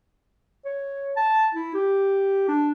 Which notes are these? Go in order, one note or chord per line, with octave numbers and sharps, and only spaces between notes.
C#5
A5
E4
G4
D4